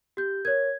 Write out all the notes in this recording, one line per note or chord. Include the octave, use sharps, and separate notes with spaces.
G4 G6
A#4 C#5 G#6